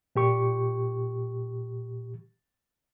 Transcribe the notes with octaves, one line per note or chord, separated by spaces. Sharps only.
A#2 G4 C#6